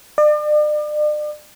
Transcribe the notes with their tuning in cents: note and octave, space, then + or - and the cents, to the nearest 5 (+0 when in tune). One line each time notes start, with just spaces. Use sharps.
D5 +40